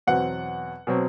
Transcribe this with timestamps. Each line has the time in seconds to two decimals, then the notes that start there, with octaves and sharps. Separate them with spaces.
0.07 E2 B2 F#3 C4 F#5
0.87 B2 F#3 C4